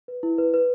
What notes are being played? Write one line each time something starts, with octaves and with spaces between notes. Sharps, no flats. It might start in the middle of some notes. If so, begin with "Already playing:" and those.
B4
E4
B4
B4